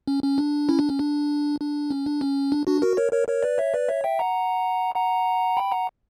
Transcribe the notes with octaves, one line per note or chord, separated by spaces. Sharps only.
C#4
C#4
D4
C#4 E4
D4
C#4
D4
D4
C#4
D4
C#4
D4
D4 F#4
F#4 A#4
A#4 C#5
A#4 C#5
A#4 C#5
B4 D5
C#5 E5
B4 D5
C#5 E5
E5 G5
F#5 A#5
F#5 A#5
G5 B5
F#5 A#5